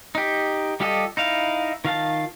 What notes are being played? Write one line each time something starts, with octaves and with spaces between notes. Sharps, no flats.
D#4 G4
G3 F4 G4 A4 D#5
D#4 E4 F5
D#3 F4 F5 A5